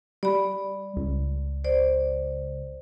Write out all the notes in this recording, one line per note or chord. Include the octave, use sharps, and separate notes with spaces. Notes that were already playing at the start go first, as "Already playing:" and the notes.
G3 D5 B5
C#2
C5 D5